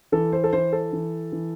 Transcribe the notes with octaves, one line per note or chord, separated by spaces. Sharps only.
E3 A4
C5
A4
E3 C5
A4
E3
E3